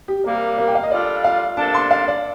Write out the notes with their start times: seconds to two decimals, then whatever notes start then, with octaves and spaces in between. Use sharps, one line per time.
0.08 G4
0.24 C3 G3 A#3 A#4
0.58 A#4
0.68 G5
0.75 F5
0.83 D#5
0.90 G3 D4 F4 A4 D5
1.24 F5
1.57 C3 G3 A#3 D4 A4 A5
1.74 C6
1.91 F5
2.08 D5